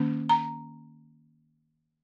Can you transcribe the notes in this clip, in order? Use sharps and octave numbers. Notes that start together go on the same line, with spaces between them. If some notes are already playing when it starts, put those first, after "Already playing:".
Already playing: D#3 A#3 C#4
A#5